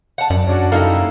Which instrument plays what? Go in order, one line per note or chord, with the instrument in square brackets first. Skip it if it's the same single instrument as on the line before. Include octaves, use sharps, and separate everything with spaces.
[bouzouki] F#5 A5
[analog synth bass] F#2 [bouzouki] D5
[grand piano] C#4 D4 F#4
[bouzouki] G3 G#3 A#3 [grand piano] D#4 E4 A4